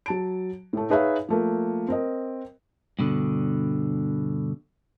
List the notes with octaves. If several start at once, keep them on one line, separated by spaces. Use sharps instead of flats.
F#3 A5 D7
A2 A3
D#4 G#4 B4 C#5 E5 F5
F3 A3 A#3
C4 A#4 D#5
G2 B2 D3